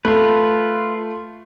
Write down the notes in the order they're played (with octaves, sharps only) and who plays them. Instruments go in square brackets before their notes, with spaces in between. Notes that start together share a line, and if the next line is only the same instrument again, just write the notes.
[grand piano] A3 [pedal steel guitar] F4 B4